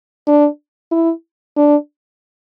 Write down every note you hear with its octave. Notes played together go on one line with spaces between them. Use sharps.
D4
E4
D4